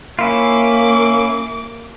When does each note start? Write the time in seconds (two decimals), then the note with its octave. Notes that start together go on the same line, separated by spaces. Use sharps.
0.19 A#3 C#4 E4 F4 D6